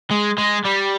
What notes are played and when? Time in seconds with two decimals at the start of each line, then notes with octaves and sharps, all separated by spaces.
0.11 G#3
0.38 G#3
0.65 G3